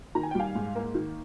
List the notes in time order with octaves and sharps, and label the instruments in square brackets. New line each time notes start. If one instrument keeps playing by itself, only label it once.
[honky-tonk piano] D#3 A#5
G#5
G5
G3 F5 G#5
G#2
A#3
D#3